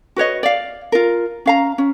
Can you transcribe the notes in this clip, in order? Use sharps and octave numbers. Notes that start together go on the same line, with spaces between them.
F#4 B4 C#5 D#5
D5 F5
F4 A#4
C#4 F5 A#5
C#4